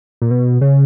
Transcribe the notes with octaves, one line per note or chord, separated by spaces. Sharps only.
A#2
B2
C#3